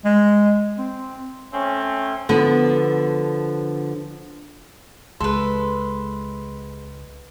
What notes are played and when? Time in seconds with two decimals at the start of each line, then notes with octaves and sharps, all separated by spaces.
0.05 G#3
0.78 C4
1.53 A3 C4 C#4
2.29 D3 F3 B3
5.20 C#2 G#3 A4 B4 C6